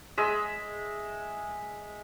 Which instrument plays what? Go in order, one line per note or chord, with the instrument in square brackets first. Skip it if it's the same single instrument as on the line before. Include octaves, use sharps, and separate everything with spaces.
[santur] G#3 E5